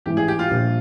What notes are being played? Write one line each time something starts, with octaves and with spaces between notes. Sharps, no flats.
A1 G#2 E3 G4
G#4
G4
F4
A#1 A#2 G3